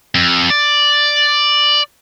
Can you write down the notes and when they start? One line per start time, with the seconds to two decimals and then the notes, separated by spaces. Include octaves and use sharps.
0.15 F2
0.50 D5